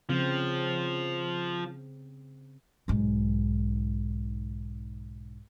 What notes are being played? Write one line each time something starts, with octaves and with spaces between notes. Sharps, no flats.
C#3 F3 C4
B1 G#2